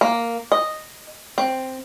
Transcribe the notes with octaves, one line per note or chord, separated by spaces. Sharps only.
A#3
D#5
C4